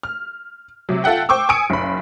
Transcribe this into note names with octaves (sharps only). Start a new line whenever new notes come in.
F6
C3 F#3
F4 A4 E5 F#5 G5
C5 G5 C#6 D6 E6
G#5 D#6 E6 C#7 D7
F#1 B1 B5